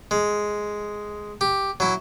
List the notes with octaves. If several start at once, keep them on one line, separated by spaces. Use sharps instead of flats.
G#3
G4
F#3 E4